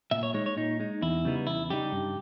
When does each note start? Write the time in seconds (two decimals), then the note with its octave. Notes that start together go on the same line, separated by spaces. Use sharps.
0.11 A#2 E5
0.23 C#5
0.34 G#3 D#4 C#5
0.46 C#5
0.57 A#2 D#4
0.80 G#3 D#4
1.02 E2 E4
1.25 C#3 G3 B3 D#4
1.47 E2 E4
1.70 C#3 G3 B3 D#4 G4
1.92 G2